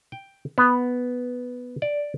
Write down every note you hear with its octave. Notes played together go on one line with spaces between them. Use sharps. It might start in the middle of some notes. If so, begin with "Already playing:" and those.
G5
B3
D5